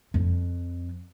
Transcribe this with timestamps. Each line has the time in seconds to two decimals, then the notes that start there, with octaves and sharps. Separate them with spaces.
0.14 F2